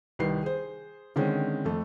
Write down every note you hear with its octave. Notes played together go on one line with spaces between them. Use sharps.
C2 D#3 B4 C7
G#4 C5
D3 D#3 G#3 C4 C#4
F2 A3